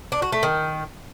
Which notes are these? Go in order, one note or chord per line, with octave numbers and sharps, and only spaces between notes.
D4
F#4
A3
D#3